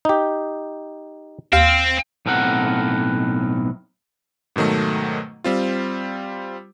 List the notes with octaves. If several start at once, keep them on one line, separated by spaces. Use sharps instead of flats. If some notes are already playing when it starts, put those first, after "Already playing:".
D#4 G4
D#2 C4 F5
B1 A2 C4 A#4 F#5
G#2 B2 D#3 F#3 A3
G3 C4 F4